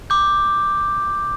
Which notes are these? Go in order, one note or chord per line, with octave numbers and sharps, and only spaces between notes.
D6 G6